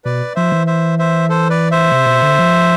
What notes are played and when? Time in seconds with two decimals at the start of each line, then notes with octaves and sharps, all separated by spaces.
0.05 B2 B4 D5
0.36 F3 C5 E5
0.52 E3
0.67 C5 E5
0.99 C5 E5
1.29 A4 C5
1.50 B4 D5
1.71 C5 E5
1.92 C3
2.06 B2
2.22 D3
2.38 F3